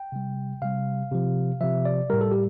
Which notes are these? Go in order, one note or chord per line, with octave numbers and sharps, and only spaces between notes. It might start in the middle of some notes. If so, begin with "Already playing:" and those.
Already playing: G5
C3 G3
C3 G3 F5
C3 F3
C3 F3 E5
D5
A2 G3 A#4
A4
G4